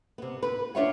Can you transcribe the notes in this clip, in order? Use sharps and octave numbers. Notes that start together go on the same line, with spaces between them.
C3 B3
B4
D4 F4 B4 C#5 E5 F#5